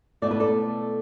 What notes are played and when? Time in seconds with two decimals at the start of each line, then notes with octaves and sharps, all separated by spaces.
0.22 B2 A3 E4 D5
0.31 B4
0.40 A4 D5